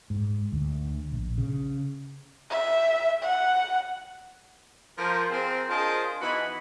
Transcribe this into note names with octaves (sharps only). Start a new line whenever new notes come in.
G#2
D2
A#1
C#3
E5
F#5
F3 A#4
C4 G#4 A#4
D4 F4 G#4 A#4 C5 D#5
E3 B3 D#4 F#4 G#4 B5